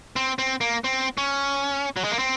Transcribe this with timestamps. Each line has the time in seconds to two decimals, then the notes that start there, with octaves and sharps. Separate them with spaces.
0.16 C4
0.39 C4
0.61 A#3
0.84 C4
1.18 C#4
1.97 F#3
2.04 G#3
2.11 A#3
2.19 C4